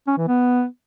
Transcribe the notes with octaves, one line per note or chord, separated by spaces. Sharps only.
C#4
E3
B3